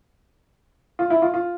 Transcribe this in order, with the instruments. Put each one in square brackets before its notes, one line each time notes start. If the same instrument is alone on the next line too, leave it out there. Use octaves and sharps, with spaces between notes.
[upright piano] F4
E4
F4
F4